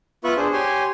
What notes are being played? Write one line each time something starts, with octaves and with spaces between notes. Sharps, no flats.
B3 F4 B4 E5 C#6 F#6
D4 G#4 C5
G4 C#5 G#5 C6